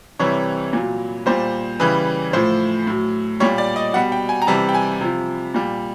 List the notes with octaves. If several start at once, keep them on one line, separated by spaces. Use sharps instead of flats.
C3 E3 G3 C#5
A#2 F#3
A#2 G3 C5
C#3 E3 G3 B4
A2 F3 C5
A2 F#3
A#2 G3 C#5
D5
D#5
B2 G3 F#5
G5
G#5
A#5
C3 E3 G3 A5
G5
G#5
C3 F3
A#2 G3